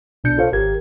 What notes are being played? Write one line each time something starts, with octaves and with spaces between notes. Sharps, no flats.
B1 B2 D4 G6 C#7
F4 A4 C5 C#5 F5
G#1 G4 A#4 G#6